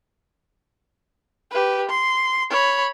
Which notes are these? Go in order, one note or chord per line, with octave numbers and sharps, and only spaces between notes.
G4 B4
C6
C#5 B5